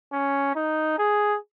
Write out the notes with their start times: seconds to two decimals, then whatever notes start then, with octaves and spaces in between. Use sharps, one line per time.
0.13 C#4
0.56 D#4
0.99 G#4